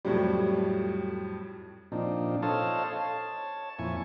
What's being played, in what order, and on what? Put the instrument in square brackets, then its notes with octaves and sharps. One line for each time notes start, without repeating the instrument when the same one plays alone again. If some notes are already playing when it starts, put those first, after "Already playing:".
[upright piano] F2 A2 F#3 G3
[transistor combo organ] A#2 F3 C4 D4 D#4
A4 C5 C#5 D#5 F5 A5
C#5 A5
F2 A#2 E4 G#5 C#6